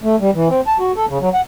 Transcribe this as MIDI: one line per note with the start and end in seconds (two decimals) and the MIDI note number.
0.03 0.16 57
0.20 0.31 55
0.34 0.48 52
0.49 0.61 60
0.67 0.77 81
0.79 0.92 66
0.96 1.06 69
1.09 1.18 49
1.21 1.29 54
1.34 1.41 78